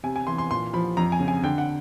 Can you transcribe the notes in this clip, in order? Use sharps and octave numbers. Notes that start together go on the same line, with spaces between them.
C3 G#5
G#5
E3 C6
C6
A#2 C6
F3 B5
F2 A#5
G#5
C#3
G#5
D3 G5
F#5